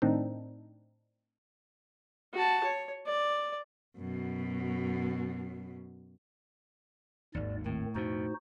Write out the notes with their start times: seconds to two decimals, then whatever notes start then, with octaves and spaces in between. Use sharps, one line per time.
0.02 A2 D#3 C4 D4 D#4
2.33 F#4 A5
2.63 C#5
3.06 D5
3.97 F#2 B2
7.35 G#1 D#2 G#2 D5
7.66 A2 D#3 C4
7.95 F2 B2 D#4 F#4 C5